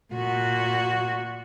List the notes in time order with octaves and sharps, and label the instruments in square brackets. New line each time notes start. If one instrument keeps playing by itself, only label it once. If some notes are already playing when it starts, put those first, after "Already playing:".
[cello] A#2 F#4